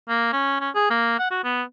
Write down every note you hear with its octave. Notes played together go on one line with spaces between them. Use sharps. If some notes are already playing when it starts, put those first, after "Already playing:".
A#3
C#4
C#4
G#4
A#3
F#5
F#4
B3